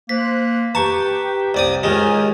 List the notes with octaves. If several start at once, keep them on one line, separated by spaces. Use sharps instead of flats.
A#3 C5 F#6 B6
G4 B4 G5 A5 A#5 C#6
C2 D5 D#6
C#2 D#3 G#3 G4 G#5 F6